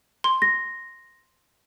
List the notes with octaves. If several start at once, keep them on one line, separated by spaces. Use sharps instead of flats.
C6
A#6